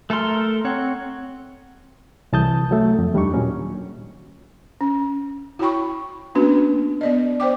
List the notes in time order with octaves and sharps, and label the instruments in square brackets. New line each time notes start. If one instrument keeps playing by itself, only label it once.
[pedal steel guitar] A3 A4 A#4 C6
C4 C#5 F#5
[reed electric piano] C2 E3 A5 D#6 G6
F#3 A3
F2
D#2 G3 D4 D#4 C#6
A#2 F#3 C#4
[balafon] C#4
E4 F#4 C#5 G5 B5 C#6
A#3 B3 C#4 D4 F#4 B4
B3 D5 D#5
C5 D5 G5 D6